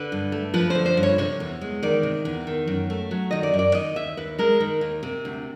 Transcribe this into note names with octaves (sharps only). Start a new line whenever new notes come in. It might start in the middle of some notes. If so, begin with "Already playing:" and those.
Already playing: D3 B4
G2
A3
F3 B4
D3 C5
C5
G2
C#5
C3 C#5
E2
G#3
D#3 D5
C3
E2
D#3
F#2
A3
F#3
D#3 D#5
D5
F#2
D5
D#3 D#5
D#2 E5
D#2 B4
G#3 A#4
D#3
D#2
C3
D2